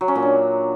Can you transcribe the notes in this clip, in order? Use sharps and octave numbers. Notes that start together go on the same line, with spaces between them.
F#3
C#4
A#2
D4